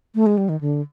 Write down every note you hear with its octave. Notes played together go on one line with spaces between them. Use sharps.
A3
G#3
G3
D#3
D3